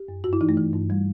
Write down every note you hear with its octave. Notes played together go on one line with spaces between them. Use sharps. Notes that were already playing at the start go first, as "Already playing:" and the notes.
Already playing: G4
F#2
G2 F#4
E4
E3 D#4
A3
E3
G2
G3